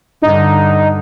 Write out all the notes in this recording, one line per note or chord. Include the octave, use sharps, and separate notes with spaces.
G2 D3 D#4